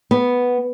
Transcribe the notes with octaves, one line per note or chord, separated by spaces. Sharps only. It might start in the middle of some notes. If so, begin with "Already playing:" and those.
B3